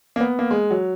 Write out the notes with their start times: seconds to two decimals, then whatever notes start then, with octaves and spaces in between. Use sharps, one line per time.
0.16 A#3
0.20 B3
0.39 A#3
0.51 G#3
0.71 F#3